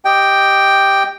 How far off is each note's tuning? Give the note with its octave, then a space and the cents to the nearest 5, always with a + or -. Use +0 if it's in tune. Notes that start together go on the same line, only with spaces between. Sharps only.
G4 +0 D#5 +0 G5 +0